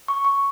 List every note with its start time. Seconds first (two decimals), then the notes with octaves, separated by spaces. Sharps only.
0.08 C#6
0.25 C#6